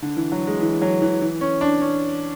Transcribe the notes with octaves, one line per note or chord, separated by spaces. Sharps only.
D3
E3
F#3
G#3
E3
F#3
E3
E3
C#4
D4
C#4